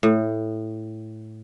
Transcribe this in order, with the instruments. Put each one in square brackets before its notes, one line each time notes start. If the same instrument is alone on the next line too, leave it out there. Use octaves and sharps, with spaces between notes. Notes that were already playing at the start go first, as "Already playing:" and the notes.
[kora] A2